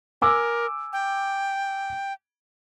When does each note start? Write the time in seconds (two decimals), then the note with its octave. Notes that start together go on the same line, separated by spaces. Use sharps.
0.22 A#4 G#5 D6 E6
0.93 G5